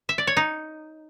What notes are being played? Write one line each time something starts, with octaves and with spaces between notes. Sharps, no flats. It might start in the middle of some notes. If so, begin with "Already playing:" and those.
E5
D5
C#5
D#4